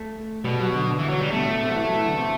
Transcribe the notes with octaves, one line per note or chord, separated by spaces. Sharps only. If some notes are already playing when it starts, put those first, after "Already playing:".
Already playing: A3
B2 G3
F#3
D3
D3
E3
F#3
G3
B2 A3
A2
B2
C3
F#3
E3
F#3
E3
D3
C3